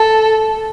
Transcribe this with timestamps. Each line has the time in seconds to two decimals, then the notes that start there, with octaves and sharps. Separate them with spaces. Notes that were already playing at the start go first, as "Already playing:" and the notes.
Already playing: A4